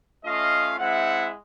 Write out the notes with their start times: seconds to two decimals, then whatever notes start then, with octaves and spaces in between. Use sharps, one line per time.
0.25 A3 C#4 F4 D#5 F5
0.79 G#3 C4 E4 E5 F#5